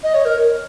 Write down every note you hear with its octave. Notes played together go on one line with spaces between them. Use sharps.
D#5
C#5
A#4